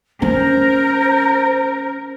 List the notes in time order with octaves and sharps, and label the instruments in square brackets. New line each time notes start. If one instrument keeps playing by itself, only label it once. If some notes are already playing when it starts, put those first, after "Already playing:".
[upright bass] C#4 [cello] A#4 [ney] C5